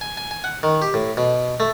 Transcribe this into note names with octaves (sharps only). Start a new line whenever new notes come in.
G#5
G#5
G#5
F#5
D#3
G4
A2
B2
A3